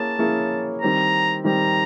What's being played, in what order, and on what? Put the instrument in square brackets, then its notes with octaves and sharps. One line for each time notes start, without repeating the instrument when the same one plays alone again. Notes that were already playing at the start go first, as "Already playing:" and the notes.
Already playing: [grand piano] A#3 C#4 E4 G#4 C#5 [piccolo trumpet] A5
[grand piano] A#3 C#4 E4 G#4 C#5
[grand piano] D#3 G3 C4 [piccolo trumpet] A#5
[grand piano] D#3 G3 C4 [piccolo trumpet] A#5